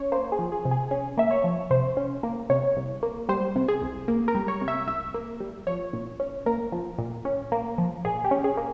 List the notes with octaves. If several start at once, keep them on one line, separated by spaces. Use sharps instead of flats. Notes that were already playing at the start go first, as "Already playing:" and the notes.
Already playing: C#4 C#5
A#3 C5
G#4
F3
G#4
C3
G#4
C#4 G#4
A#3 E5
C#5
F3
C3 C5
C#4
A#3
C3 C#5
C2
A#3
G3 C5
C3
G#4
C2
A#3
A#4
G3
C#5
C3
E5
C2 E5
A#3
G3
F3 C#5
A#2
C#4
A#3 A#4
F3
A#2
C#4
A#3
F3
A#2 G#4
G4
C#4
G#4
A#3